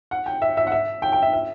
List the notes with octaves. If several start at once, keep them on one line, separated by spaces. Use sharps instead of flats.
F#5
G5
E5
E5
F#5
E5
G5
G5
E5
E5